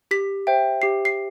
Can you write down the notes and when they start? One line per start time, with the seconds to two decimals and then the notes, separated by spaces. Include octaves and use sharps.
0.11 G4 B6
0.47 C5 E5 G5
0.82 G4 C7
1.05 C7